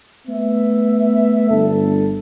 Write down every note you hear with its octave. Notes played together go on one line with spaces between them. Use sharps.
A3 B3 E5
G1 D4 A4